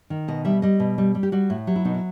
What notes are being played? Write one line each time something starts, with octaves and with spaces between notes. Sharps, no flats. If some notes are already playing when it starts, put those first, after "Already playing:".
D#3
B2 D#5
G3 E5
G3 D#5
B2
G3
G3
G4
G3 F#4
A2
F#3 G4
E4
B2 D#4
E4